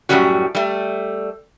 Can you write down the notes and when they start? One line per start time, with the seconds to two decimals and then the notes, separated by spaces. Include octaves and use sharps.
0.09 F#2 A2 D#3 G3 C#4 F#4
0.55 G3 A3